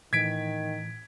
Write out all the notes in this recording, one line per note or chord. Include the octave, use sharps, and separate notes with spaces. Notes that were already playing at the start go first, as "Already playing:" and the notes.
A2 D#3 E3 G#6 B6 D7